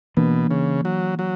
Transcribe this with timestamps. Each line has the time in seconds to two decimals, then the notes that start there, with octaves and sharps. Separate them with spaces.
0.17 B2 E3 A#3 D4
0.51 C#3
0.85 F#3
1.19 F#3